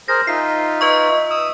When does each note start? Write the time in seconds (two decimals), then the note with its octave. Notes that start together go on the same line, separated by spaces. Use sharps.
0.08 G#4 A#4 C5 A#6
0.27 D#4 F4 E5 C7
0.81 B4 D#5 C#6
1.30 D#6 E6